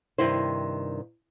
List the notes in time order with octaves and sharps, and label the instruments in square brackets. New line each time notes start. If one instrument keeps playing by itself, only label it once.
[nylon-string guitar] G2 C3 D#3 E4 C5